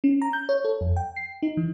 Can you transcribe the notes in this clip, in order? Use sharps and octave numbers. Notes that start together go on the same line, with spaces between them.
C#4
A#5
G6
C#5
A4
F2
G5
C7
D#4
E3